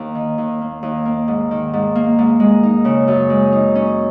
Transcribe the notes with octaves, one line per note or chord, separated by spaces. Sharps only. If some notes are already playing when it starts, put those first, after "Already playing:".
Already playing: D#2 A#3
D#3
D#2
A#3
D#2
A#3
G#2
D#3
G#2
A#3
G#2
G#3
D#4
C#3
F#2
G#3
D#4
C#4